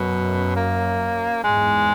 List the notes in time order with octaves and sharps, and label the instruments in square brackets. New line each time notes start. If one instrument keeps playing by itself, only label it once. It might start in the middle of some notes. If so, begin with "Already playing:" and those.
Already playing: [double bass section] F#2 [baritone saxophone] B2
[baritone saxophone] A#3
[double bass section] E2 G#2 [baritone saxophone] G#3